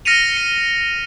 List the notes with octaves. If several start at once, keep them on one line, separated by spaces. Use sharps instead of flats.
F6 A#6 B6 C#7 D#7 F7
C#7